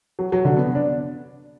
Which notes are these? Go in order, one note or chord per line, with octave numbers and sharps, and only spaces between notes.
F#3
F#3
D3
B3
D4